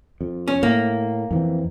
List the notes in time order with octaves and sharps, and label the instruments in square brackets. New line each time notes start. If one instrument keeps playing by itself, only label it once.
[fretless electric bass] F2
[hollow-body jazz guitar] C#4
[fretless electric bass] A2 [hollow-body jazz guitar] A#3
[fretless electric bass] F2 E3 C4